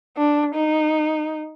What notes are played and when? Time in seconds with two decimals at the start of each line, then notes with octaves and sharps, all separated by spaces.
0.17 D4
0.55 D#4